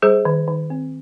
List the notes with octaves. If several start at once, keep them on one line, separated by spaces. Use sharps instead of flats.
G3 G#4 C5
D#3
D#3
C4